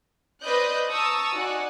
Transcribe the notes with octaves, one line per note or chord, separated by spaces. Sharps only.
B4 C5 D5 D#5 F#6 G6
A5 A#5 C#6 D#6 E6
D#4 F#4 D5 F#5 G#5